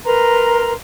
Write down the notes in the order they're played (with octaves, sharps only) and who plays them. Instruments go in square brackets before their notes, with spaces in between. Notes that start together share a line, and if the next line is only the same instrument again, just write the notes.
[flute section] A#4 B4 A#5 C6